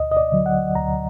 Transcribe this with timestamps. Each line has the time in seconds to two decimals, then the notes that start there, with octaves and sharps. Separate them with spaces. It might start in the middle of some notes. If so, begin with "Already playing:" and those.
Already playing: D2 D#5
0.11 D#5
0.17 D5
0.32 D3 F#3
0.46 F#5
0.75 D2 A#5